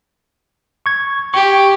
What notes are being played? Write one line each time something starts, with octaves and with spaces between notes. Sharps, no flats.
C#6 G#6
G4 C#6